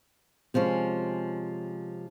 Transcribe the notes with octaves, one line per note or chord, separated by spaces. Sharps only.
C3 F3 G#3 C#4